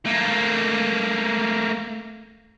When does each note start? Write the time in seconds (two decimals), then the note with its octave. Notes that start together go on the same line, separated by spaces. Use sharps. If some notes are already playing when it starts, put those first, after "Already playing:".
0.05 A3 A#3